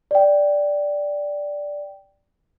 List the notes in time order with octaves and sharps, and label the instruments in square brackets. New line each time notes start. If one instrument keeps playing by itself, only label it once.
[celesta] D5 G5